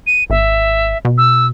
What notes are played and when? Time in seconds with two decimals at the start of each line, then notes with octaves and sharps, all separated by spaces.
0.07 D#7
0.30 G#1 E5
1.05 B2
1.18 E6